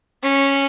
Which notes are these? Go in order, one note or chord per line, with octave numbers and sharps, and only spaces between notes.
C#4